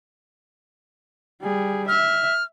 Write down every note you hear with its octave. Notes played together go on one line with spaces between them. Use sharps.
G3 G#4
E5 F6